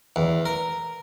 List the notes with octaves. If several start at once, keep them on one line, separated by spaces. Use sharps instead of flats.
E2
A#4